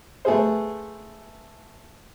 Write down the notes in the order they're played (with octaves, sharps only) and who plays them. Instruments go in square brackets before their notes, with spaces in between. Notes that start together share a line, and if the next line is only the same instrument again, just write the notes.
[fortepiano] A3 B3 G#4 C5